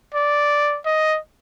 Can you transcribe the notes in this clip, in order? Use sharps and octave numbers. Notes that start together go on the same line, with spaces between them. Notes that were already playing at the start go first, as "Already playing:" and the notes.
D5
D#5